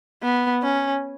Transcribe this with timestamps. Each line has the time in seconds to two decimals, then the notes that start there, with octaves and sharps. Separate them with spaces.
0.23 B3
0.63 C#4